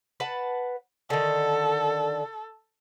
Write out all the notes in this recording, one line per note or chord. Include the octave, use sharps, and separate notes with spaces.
B4 F#5 A5
D3 D#3 A4